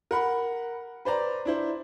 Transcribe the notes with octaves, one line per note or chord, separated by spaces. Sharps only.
A#4 F#5 B5
B4 C5 D5 A#5
D4 E4 C5